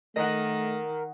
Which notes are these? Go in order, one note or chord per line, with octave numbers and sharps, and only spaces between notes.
D#3 A3 A#4 D#5 F#5